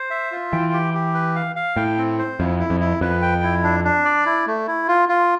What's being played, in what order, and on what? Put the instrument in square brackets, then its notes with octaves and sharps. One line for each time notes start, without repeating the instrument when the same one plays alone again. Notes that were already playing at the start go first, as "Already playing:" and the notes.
Already playing: [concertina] C5
E5
F4
[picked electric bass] E3 [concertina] G5
[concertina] G4
G4
B4
F5
F5
[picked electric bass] A2 [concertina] G5
[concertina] C4
C5
[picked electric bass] F2 [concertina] E4
[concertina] E4
[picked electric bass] F2
[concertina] E4
[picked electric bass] F2 [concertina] B4
[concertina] G5
E4
D4
D4
D5
E4
A3
E4
F4
F4